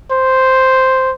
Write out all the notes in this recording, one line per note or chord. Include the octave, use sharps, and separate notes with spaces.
C5